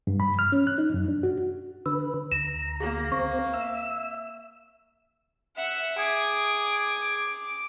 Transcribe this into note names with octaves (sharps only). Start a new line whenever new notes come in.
G2
B5
F6
C#4
F#6
D#4
F#2
D4
F#4
D3 B4 E6
D2 A#5 E7
A#3 G#4
C4 C#6
E5 E6
E5 F#5
G#4 D6